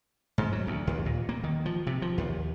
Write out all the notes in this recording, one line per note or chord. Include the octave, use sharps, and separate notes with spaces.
G#2
F#3
D2
D#2
A#2
A#3
D#3
F3
C3
F3
D#2